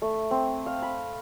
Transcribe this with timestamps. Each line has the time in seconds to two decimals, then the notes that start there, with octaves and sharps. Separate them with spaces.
0.02 A3
0.31 C4
0.66 F5
0.82 B5